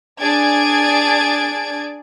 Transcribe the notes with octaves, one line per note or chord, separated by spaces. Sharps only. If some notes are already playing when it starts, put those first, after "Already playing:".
D4 G#4 D5 G#6 A6 D7